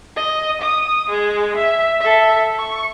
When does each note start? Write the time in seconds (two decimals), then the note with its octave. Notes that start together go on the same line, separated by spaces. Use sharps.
0.16 D#5
0.61 D#6
1.10 G#3
1.56 E5
2.00 A4 E5
2.58 C#6